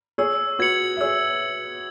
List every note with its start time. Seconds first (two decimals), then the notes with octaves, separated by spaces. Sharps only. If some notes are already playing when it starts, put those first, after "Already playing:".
0.18 G#4 C#5 E6
0.59 F#4 B4 G#6 C#7 F#7
0.97 E5
1.01 G#4 C#5 E6